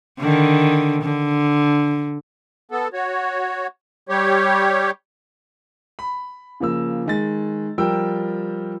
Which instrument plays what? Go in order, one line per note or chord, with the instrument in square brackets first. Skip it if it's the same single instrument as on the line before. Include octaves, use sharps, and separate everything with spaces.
[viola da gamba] D3 D#3
D3
[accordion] B3 A4
F#4 C#5
G3 G4 C#5
[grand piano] B5
C#3 F3 A#3 E6
D#3 G#3 A6
F3 G3 A#4 G5 E6